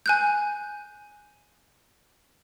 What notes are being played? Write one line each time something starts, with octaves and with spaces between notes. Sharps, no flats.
G#5 F#6 G6